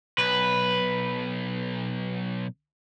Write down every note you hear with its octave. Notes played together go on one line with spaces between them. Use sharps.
B1 B4